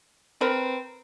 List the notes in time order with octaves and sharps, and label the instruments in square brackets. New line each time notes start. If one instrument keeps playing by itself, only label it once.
[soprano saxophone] C4 [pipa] A#4 B4